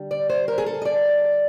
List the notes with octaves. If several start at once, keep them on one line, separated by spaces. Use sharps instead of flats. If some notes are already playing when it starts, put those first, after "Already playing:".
Already playing: D3 G3
D5
C5
A#4
G#4
A4
D#5
D5